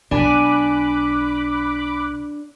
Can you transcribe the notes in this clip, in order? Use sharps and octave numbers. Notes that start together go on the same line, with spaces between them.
B1 D4 G#5 B5 D6 F#6